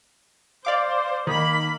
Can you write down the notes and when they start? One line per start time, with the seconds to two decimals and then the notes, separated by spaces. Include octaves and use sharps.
0.65 C5 D5 F5 D6
1.27 D#3 A#3 B5